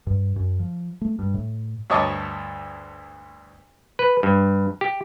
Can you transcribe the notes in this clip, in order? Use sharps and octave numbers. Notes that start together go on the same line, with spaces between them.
G2
F#2
F3
A3
G2
A2
D2 G2 C#5 D#5 A5 D6
B4
G2
G4